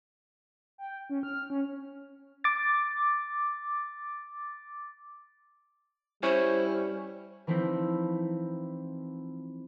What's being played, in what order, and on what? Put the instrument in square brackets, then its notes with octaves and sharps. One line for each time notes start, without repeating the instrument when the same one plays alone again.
[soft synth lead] G5
C#4
F6
C#4
[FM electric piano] D6 A6
[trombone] G3 [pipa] C#4 [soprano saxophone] E4 [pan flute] C5
[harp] E3 F3 A3 C4 D#4 E4